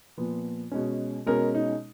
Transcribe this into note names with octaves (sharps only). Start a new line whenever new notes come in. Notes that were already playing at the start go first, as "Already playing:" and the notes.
A#2 F3 B3
B2 G#3 C#4
B2 G#3 C#4 A#4
D#4